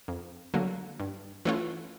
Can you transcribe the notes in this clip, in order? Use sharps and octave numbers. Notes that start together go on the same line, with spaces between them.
F2
D3 F#3 A#3
G2
E3 A3 C#4 F4